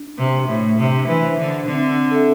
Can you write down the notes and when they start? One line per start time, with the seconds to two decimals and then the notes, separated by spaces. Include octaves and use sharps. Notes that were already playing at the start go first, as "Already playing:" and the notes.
Already playing: D4
0.18 C3
0.33 C5 E5
0.48 A2
0.78 C3 D4
1.07 E3
1.23 C5 E5
1.38 D3
1.67 D3 C4
2.11 A4 E5